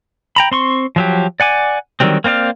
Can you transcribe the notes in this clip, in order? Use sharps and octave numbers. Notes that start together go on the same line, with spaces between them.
G5 A#5 B5
C4 C6 C#6
F3 F#3 G4
D5 F#5 G#5 D6
D3 D#3 F#3 G3 C4
A#3 C4 C5 D5 F5